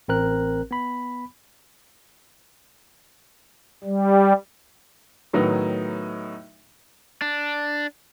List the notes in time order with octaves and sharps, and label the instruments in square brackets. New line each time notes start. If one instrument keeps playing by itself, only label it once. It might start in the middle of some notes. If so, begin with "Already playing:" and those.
[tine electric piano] A1 C4 A#4 F#6
B3 B5
[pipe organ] G3
[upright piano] A2 D#3 F#3 B3 D#4
[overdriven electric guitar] D4